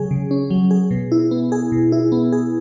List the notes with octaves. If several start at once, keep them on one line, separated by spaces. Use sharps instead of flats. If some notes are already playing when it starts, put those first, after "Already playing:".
Already playing: C#3 F#3 C#4 G#4
C#3
C#4
F#3
G#4
B2
E4
B3
G#4
B2
E4
B3
G#4